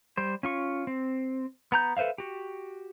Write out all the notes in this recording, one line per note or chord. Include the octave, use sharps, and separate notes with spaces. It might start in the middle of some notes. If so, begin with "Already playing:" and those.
G3 C5
C#4 F4 C#6
C4
B3 A#5 G6
A4 B4 C5 E5 F5
F#4 G4